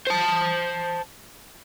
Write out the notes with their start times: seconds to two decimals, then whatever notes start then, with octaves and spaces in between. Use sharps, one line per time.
0.07 C5 A5